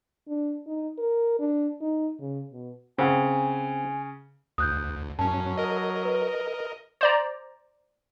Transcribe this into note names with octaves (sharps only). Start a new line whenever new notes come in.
D4
D#4
A#4
D4
D#4
C#3
B2
C#3 C4 F#5 G#5
D2 D#6 F#6 G6
F#2 F#3 C#4 A5
A#4 D#5
B4
C5 D5 A#5